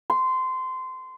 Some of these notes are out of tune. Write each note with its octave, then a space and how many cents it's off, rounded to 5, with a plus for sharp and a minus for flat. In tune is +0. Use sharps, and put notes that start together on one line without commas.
C6 -20